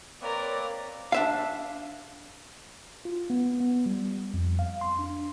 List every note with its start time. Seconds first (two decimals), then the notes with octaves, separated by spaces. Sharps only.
0.22 A#3 C4 A#4 B4 C#5 D5
1.12 D4 E5 F5
3.05 F4
3.30 B3
3.60 B3
3.86 G3
4.34 F2
4.59 F5
4.81 C6
4.99 D4